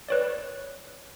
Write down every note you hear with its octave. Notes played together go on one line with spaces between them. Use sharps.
B4 C#5 D5